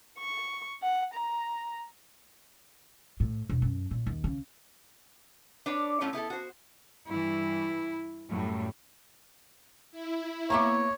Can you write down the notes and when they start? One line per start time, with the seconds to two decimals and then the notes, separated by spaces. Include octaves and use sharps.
0.18 C#6
0.83 F#5
1.15 A#5
3.20 A2
3.49 E1
3.62 F#2
3.91 A#2
4.06 D#2
4.24 C#3
5.66 D4 B4 C#5 D5
6.01 A2 F#3 A3 C#4 E4 F4
6.13 B3 E4 G#4 A4
6.30 F#4 C5
7.08 G2 E3 E4
8.30 F#2 A2 F#3 G3
9.92 E4
10.50 A#3 B3 C#5 E5 A#5 C#6 D6